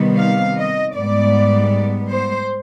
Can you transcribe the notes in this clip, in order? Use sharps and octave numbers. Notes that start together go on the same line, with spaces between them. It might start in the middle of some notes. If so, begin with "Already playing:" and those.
Already playing: C3 D#3 G3 B3
F5
D#5
G#2 G3 B3 D5
C5